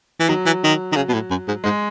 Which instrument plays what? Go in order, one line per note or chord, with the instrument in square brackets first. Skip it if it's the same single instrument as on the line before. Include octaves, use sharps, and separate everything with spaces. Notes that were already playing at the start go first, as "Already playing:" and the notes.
[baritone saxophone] E3
[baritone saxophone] D#3 [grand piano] F#3
[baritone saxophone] E3
D#3
D#3
C#3
B2
A2
F#2
G#2
[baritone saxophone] G#2 [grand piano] G#3